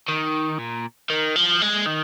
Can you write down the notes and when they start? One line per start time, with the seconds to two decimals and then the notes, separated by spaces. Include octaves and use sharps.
0.08 D#3
0.59 A#2
1.10 D#3
1.36 F3
1.62 G#3
1.86 D#3